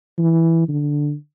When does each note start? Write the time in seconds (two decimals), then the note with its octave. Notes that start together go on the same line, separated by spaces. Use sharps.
0.19 E3
0.69 D3